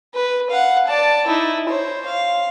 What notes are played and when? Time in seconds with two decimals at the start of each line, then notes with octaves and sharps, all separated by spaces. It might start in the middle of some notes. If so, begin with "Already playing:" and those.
0.14 B4
0.50 F5 F#5
0.88 D5 A5
1.27 D#4 E4
1.69 C5 C#5
2.05 F5